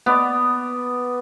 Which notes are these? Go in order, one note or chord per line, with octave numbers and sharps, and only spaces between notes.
B3 D5